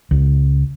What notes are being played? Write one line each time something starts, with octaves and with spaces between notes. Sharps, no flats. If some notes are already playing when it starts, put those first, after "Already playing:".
C#2